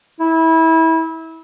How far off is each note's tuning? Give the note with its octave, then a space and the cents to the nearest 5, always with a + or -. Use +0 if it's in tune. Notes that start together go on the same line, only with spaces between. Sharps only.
E4 -25